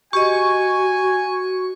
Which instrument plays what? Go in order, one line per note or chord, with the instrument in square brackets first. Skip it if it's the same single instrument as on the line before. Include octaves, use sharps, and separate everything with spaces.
[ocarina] F#4 [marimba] G4 D#5 [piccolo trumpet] G#5 [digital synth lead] C#6